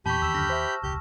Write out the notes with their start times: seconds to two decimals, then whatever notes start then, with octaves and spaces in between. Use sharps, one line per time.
0.06 E2 A#2 G4 A5 B5 C#6 G6
0.22 D#2 E6 E7
0.35 F#2 D3 F6 A#6
0.50 C5 E5
0.83 E1 C#2 G4 G6